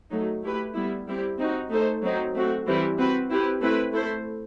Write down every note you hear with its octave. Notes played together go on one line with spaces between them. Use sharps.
F#3 A3 D#4
A3 E4 G4 B4
G3 B3 E4
G3 C4 E4 G4
C4 D#4 F#4
A3 D#4 A4 C5
F#3 C4 D#4
A3 C4 F#4
E3 G3 C4 E4 G4
C4 F#4 B4
C4 E4 G4 B4
A3 C4 E4 B4
A3 E4 A4 C5